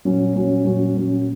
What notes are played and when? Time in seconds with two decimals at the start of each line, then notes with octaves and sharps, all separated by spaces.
0.05 A#2 F#3 C#4 F#4
0.34 A#2 F#3 C#4 F#4
0.64 A#2 F#3 C#4 F#4
0.94 A#2 F#3 C#4 F#4